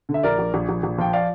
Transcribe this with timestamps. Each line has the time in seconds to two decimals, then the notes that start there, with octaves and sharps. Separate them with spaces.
0.09 D3
0.14 E5
0.23 A#1 A#4 D5
0.39 A#1
0.54 A#1
0.69 A#1
0.83 A#1
0.98 F3 G5
1.13 D5 F5